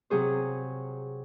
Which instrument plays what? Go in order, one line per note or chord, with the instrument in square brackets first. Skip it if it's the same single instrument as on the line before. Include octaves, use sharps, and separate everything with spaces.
[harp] C3 F#3 G#4 C5